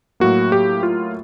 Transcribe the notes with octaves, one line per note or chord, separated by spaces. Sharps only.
A2 F#3 A#3 F#4
G4
F4